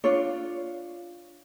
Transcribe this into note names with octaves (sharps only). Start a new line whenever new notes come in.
D4 F4 C#5